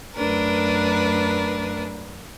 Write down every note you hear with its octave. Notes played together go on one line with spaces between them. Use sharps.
F#2 A3 D4 A#4 B4